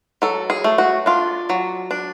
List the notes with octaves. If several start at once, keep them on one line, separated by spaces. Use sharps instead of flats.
F#3 A4
G#4
A3
F#4
D4 F4
F#3
D4